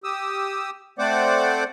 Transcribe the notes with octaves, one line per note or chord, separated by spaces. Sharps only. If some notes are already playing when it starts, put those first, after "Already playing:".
G4 D#6 E6
A3 C4 C5 D5 F#5 D6